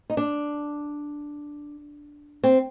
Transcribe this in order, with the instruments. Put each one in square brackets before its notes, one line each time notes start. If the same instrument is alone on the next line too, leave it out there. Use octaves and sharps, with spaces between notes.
[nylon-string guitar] D#4
D4
C4